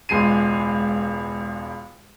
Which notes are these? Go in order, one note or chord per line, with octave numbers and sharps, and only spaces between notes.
E1 C#2 G#3 C7 D#7